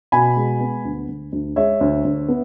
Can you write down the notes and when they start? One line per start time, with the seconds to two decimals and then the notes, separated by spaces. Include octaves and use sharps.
0.12 B2 G#5 B5
0.37 G#3
0.60 B3
0.85 D2
1.09 D2
1.32 D2
1.56 G#3 C#5 E5
1.81 D2
2.04 D2
2.28 B3